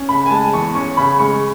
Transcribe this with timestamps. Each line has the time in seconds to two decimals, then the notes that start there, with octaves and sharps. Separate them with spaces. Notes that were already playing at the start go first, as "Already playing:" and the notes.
Already playing: C#4
0.09 C#3 B5
0.26 G#5
0.30 G#3 A5
0.53 E2 C#6
0.75 C#4 C#6
0.97 C#3 B5
1.19 G#3 C#6